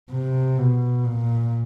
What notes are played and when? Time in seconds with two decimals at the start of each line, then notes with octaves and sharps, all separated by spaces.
0.12 C3
0.58 B2
1.05 A#2